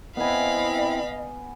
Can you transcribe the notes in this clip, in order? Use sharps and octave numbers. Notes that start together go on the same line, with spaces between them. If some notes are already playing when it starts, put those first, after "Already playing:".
B3 C4 E4 B4 D#5 F5 G#5 B5